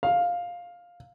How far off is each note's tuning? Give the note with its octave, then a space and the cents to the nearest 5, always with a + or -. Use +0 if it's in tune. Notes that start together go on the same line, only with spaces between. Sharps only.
F5 +10